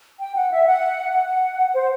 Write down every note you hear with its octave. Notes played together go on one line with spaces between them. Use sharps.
G5
F#5
E5
F#5
F#5
C5